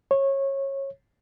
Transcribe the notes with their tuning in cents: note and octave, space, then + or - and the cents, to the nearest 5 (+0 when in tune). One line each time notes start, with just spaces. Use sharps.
C#5 -20